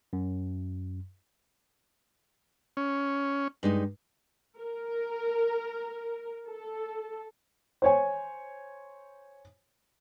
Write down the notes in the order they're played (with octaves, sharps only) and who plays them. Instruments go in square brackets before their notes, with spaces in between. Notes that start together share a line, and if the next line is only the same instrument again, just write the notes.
[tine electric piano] F#2
[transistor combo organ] C#4
[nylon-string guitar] G2 G#3 D#4
[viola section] A#4
A4
[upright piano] C5 C#5 G#5